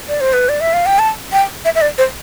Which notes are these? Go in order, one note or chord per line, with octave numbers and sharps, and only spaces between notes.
D5
C5
B4
D5
E5
F5
G5
A5
G5
E5
E5
D5
C5